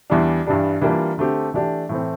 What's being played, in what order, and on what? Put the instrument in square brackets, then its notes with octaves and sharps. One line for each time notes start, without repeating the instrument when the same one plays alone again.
[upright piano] E2 E3 G3 D4
G2 E3 G3 D4
E3 G3 A#3 D4 F4
D3 A3 C4 G4
E3 A3 D4 G4
A2 E3 A3 C4